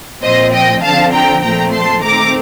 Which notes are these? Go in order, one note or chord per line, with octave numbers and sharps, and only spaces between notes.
A#2 F3 C4 C5 D#5
D#5 G5
D3 F3 C4 F5 A5
G5 A#5
A#2 F3 A3 C4 G5 A#5
A5 C6
D#3 A3 C4 A#5 D6